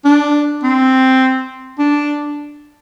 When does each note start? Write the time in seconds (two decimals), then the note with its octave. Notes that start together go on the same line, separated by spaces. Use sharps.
0.05 D4
0.63 C4
1.79 D4